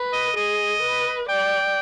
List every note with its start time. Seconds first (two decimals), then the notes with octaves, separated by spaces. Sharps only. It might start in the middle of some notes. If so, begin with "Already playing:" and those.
Already playing: B4
0.13 D#5
0.36 G#4 D#5
0.82 B4
1.29 D5 G5